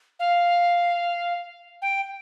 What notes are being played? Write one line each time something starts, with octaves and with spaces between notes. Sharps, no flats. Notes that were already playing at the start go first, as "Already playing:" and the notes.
F5
G5